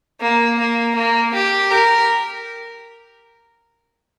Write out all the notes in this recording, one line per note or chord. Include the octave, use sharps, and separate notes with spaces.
A#3
A#3
A#3
G4
A#4